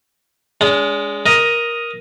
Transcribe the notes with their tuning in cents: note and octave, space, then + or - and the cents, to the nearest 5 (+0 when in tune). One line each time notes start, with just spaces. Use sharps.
G#3 -5 D4 -45
A#4 +10 D#5 +0